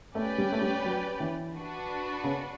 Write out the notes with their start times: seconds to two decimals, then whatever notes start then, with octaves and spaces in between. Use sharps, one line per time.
0.15 A3 C#4 G4 B4 D5 G5
0.38 G3
0.53 A3
0.62 G3
0.85 F#3
1.20 E3
1.54 D4 F#4 B4
2.24 C#3